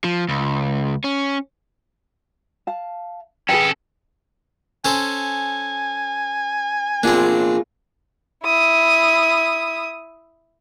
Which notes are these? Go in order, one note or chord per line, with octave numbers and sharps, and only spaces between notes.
F3
C#2
C#4
F5 A5
C#4 G#4 A4 B4 G5
C#4 A4 C5 G#5
A#3 C4 D4 F4 G#4
E4 D#6